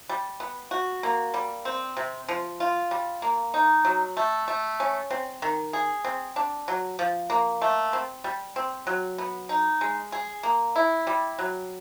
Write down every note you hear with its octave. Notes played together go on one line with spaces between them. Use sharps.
G3
B3
F#4
A#3
G3
C4
C3
F3
F4
G3
A#3
D#4
F#3
A3
A3
C#4
C4
D#3
G#4
C4
D4
F#3
F3
A#3
A3
C4
G3
C4
F#3
B3
D#4
G#3
G#4
A#3
E4
G3
F#3